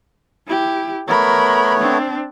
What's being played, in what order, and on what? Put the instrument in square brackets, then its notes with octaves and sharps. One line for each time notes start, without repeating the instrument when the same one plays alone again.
[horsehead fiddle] E4 G4
[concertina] A3 B3 C#5 [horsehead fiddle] A#4 B5
[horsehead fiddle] C4 D4